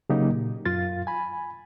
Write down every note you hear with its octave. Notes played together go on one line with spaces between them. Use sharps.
C#3 F#3 A#3 D#4 G4
A#2
F#2 F4 F5 A6
G#5 B5